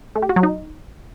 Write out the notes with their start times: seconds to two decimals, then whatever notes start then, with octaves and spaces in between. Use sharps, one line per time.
0.15 A3
0.22 G4
0.29 F#4
0.36 F#3
0.43 D#4